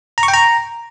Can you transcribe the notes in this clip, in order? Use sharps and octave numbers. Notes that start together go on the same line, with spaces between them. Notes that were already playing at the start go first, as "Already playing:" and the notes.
A#5
C#6
G5
A#5